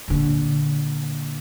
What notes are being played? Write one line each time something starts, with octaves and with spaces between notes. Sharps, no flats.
A#2 D3